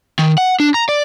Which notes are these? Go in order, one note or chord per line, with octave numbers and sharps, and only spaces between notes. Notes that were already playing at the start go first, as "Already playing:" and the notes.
D#3
F#5
D4
A#5
D5